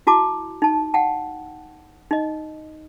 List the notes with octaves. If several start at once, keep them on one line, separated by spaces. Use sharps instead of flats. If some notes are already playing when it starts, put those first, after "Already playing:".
E4 F#4 A5 D6
D#4 A5
F#5 G5 A5
D#4 D#5